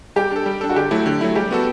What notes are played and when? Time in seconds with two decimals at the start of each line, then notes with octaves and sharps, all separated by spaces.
0.16 G3 G4
0.32 D4 A4
0.46 G3
0.61 D4 A4
0.69 F#4
0.76 D3 G4
0.91 F#3 A3 E4
1.06 D3
1.21 F#3 A3 E4
1.35 G3 G4
1.51 B3 F#4 A4